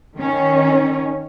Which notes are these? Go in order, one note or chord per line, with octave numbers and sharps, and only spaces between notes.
D#3 C#4